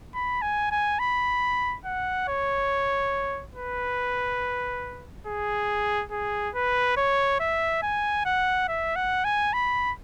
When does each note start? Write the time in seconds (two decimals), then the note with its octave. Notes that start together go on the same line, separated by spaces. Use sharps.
0.15 B5
0.42 G#5
0.72 G#5
0.99 B5
1.85 F#5
2.28 C#5
3.55 B4
5.27 G#4
6.11 G#4
6.55 B4
6.97 C#5
7.40 E5
7.83 G#5
8.26 F#5
8.69 E5
8.96 F#5
9.25 G#5
9.53 B5